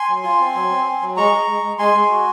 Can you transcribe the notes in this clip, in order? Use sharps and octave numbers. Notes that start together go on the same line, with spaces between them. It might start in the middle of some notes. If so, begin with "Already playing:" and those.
Already playing: G#5 C6
F#3
F4
C4
F#3
C4
C4
F#3
G#3 A#5 C#6
G#3
G#3
G#3
G#3 G#5 C6
G#3
F#4